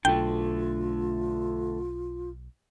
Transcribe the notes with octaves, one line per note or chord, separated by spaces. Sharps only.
B1 D3 A3 F4 G5